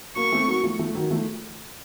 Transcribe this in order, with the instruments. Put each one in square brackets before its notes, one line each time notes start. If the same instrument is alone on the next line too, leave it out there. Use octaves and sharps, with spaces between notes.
[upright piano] F#3 A#3 [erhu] C#6
[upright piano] A3 C4
F#3 A#3
F3 A3
F3 A3
D#3 F#3
F3 A3